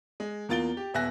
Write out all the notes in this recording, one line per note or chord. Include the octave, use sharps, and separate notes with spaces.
G#3
E2 A#3 F4 A6 D7 G7
G4
D#1 B3 E5 G#5 F#6 A#6